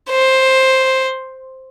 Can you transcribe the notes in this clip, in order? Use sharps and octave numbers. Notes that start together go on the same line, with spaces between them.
C5